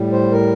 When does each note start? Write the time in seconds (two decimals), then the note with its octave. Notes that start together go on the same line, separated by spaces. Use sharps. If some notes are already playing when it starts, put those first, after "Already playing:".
Already playing: A2 G3
0.12 C5
0.32 A#4